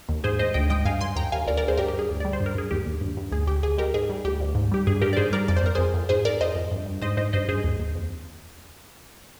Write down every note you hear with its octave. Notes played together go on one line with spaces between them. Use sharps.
D#2
G#2 G#4 C5
G#2 C5 D#5
D2 D#5 G5
G#3 D#5 G5
G2 F5 G#5
G2 G#5 C6
D#2 G5 A#5
D#2 F5 G#5
D2 A#4 D5
A#4 D5
D2
G#4 C5
G2 G4 A#4
G4
G2
G#4
D2
G3 D5
C5
G2
A#4
G2 G#4
D#2 G4
D#2
G2
G2
D2 G#4
D2 G4
D2 G#4
G#3 G4 A#4
G#2 G#4
G3
D2 G4
D2
G#2
G3 G4
G2 G#4
G2 G4 A#4
D5
G#2 G#4 C5
G3 A#4 D5
F2 D5
C5
F2 A#4
F2 G#4 C5
F2
G#2 G#4 C5
G#2 A#4 D5
F2 C5 D#5
F2
G2
G2
G#2 C5 D#5
G#2 C5 D#5
G2 C5 D#5
G2 G#4 C5
D#2
D#2
F2